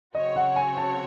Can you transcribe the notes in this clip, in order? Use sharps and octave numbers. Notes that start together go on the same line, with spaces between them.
C#3 F#3 C4 F#4 C#5 D#5
F#5
G#5
A5